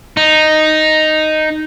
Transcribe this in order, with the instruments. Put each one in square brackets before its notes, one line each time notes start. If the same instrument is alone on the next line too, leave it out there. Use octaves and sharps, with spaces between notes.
[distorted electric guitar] D#4